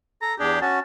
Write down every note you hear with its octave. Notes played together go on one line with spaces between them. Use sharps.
A4 A#5
E2 D4 G4 G#4
C#4 F#4 A5